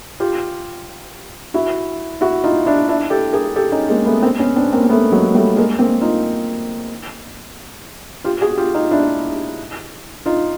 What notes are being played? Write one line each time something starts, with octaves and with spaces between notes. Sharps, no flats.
F4 G4
E4 F#4
E4 F#4
D#4 F4
D4 E4
D4 E4
G4 A4
G#4 A#4
G4 A4
C#4 D#4
G#3 A#3
A3 B3
A#3 C4
B3 C#4
C4 D4
A#3 C4
C4
A3 B3
F#3 G#3
G3 A3
G#3 A#3
A#3 C4
D#4 F4
F4 G4
F#4 G#4
F4 G4
D#4 F4
D4 E4
D#4 F4